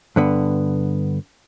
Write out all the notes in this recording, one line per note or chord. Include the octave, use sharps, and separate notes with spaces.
G2 D3 B3